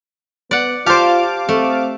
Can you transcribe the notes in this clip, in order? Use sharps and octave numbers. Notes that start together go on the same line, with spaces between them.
B3 D5 F#5
F4 G4 C5 F5 A5 D6
A3 C4